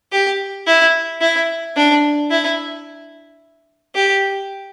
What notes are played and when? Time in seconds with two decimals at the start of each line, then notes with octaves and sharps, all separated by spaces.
0.12 G4
0.67 E4
1.21 E4
1.76 D4
2.31 E4
3.95 G4